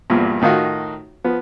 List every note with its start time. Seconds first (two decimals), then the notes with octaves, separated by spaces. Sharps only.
0.10 E2 G2 A#2 F3
0.41 A2 D#3 D#4 F4 F#4
1.24 F3 B3